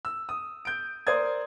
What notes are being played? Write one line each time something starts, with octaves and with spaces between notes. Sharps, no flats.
E6
D#6
G6 D7
A#4 C5 D5 D#6 G#6